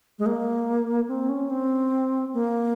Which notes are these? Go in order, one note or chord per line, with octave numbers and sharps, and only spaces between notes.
G#3
A#3
C4
C#4
C4
A#3